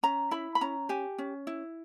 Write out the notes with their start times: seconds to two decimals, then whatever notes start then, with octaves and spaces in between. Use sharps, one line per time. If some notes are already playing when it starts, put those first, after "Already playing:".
0.03 C#4 A#5
0.31 E4 B5
0.55 B5
0.61 C#4 A#5
0.89 G4 G#5
1.18 C#4
1.47 E4